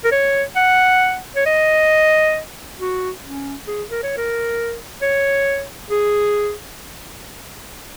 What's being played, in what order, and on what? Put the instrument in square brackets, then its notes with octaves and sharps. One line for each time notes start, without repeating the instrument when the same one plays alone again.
[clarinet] A#4
C#5
F#5
C#5
D#5
F#4
C#4
G#4
A#4
C#5
A#4
C#5
G#4